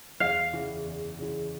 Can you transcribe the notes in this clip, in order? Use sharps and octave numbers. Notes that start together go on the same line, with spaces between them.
E2 F5
C#3 E3
E2
C#3 E3